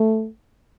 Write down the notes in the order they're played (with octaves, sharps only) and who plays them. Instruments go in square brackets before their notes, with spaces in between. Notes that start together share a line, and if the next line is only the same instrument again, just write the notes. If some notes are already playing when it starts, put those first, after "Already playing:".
Already playing: [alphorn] A3